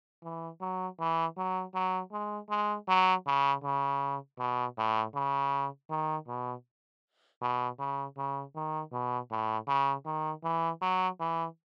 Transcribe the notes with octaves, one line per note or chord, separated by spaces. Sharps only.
E3
F#3
E3
F#3
F#3
G#3
G#3
F#3
C#3
C#3
B2
A2
C#3
D#3
B2
B2
C#3
C#3
D#3
B2
A2
C#3
D#3
E3
F#3
E3